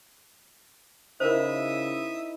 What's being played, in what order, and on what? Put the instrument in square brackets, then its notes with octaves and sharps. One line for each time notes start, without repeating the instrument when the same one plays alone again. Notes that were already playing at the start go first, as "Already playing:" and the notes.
[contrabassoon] C#3 [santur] D#4 E4 [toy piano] A#4 C5 [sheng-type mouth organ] E5 D#6